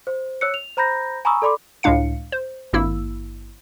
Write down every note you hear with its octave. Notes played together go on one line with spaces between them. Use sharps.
C5
C#5 E6 F#6 C#7
F7
C5 A#5 B5 G6 A#6
G#5 A#5 B5 C#6 D#6 E6
A4 D5 B5 C6 D6
C#2 A2 G#3 D4 F5 C#7
C5
G#1 G2 A#3 E4 E6